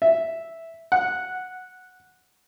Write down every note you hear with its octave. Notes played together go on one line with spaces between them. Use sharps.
E5
F#5